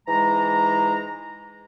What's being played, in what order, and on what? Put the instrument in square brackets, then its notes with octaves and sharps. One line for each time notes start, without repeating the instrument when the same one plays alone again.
[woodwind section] G#2 E3 G#3 A#5